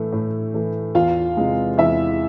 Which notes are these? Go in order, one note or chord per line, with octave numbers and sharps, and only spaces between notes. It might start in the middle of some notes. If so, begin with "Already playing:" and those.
Already playing: A2 E3 A3
A2
E3 A3
E2 F4 F5
C3 E3 G#3
E2 E4 E5